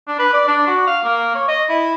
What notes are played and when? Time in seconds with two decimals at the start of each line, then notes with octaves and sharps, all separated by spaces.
0.08 D4
0.19 B4
0.33 D5
0.48 D4
0.67 F#4
0.87 F5
1.04 A#3
1.35 C#5
1.48 D#5
1.69 E4